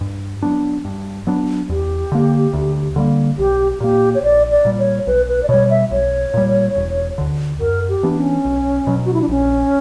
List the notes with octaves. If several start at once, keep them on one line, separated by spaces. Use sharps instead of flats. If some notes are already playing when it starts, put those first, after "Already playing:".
G2
F#3 B3 D4
G2
F#3 B3 D4
E2 G4
D3 A#3
D2
D3 G3 A#3
B1 G4
A#2 A#3 G4
C#5
A#1 D5
D5
A#2 G3
C#5
B1 B4
B4
D5
B2 G3 C#5
E5
B1 C#5
A#2 G3
E1
D2 D3
F#2 A#4
G4
E3 B3 D4
C#4
B1
B2 F#3
F#4
E4
D4
A#1 C#4